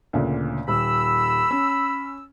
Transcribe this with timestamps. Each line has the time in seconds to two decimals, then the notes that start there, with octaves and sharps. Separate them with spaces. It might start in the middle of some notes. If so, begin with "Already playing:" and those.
0.13 D2 A#2 C#3
0.68 D#1 B5 E6
1.51 C#4